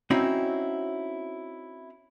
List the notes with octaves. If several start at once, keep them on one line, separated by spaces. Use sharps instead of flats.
C4 C#4 D#4 E4 F#4